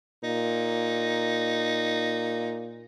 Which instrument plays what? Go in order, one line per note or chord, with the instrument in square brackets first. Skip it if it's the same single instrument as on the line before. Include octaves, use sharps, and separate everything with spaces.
[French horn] A#2 [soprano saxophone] D#4